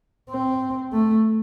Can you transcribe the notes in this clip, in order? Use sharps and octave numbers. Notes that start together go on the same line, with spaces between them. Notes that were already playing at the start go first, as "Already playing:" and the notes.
C4
A3